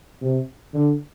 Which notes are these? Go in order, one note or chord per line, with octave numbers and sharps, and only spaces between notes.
C3
D3